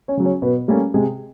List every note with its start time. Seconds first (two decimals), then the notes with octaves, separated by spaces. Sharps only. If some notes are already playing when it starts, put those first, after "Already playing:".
0.08 C#4 C#5
0.17 C#3 F#3
0.25 C#4 C#5
0.42 B2 B3 B4
0.68 G3 A3 A#3 C#4 A4
0.94 C3 G#3 G#4